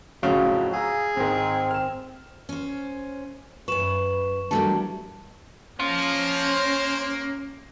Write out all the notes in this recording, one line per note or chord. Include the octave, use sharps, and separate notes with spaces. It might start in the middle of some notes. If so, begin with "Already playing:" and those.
F2 A2 C#3 F#3 F#4
G#4 F5 A#5 E6
G#2 D#3 C4
F6 E7
C#4 C5
F#2 B4 C#6 E7
E3 F#3 G3 A3 A#3 D4 A5
A#3 C#4 C5 F5